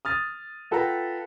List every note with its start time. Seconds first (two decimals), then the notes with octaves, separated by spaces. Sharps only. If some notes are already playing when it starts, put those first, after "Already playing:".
0.05 D#6 F6 A6
0.71 F4 A4 B4 F#5 G5 A#5